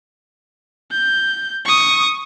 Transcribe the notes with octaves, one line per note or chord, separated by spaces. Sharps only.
G6
C#6 D#6